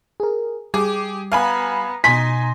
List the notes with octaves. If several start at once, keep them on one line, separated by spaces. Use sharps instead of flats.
G#4 A#4
G3 G4 G#4 D6
B3 F5 G#5 A#5 B5
B2 D#4 G#5 C6 A#6 B6